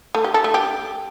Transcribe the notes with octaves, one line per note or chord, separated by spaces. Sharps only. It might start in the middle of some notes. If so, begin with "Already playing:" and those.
A3
G4
A4
A3
G4